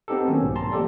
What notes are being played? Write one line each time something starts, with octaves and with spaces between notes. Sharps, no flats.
B3 C4 D#4 G4 A4
D#3 F#3 A#3 C#4
B1 G#2
A5 A#5 C6
F3 G#3 A#3 G4 A4 D5